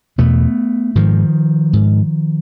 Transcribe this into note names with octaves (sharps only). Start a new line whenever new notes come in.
E2 B2 A3 B3
G#2 D#3 F3
G#2